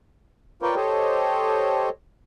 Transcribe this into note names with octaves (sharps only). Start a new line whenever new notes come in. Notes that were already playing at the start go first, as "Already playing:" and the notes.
F4 A#4 B4 C#5 D5 G5
G4 A4 C5 C#5 D#5